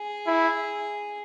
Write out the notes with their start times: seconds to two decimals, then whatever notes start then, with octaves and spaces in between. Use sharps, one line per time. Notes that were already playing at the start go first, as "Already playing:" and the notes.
Already playing: G#4
0.27 E4